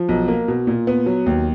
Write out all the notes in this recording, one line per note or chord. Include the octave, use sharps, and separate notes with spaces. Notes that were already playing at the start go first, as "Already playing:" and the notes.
Already playing: F3
B1
A#3
B2
A#2
B3
F#3
D#2